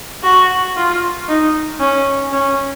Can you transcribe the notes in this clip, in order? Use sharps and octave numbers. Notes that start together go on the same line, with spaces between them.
F#4
F4
D#4
C#4
C#4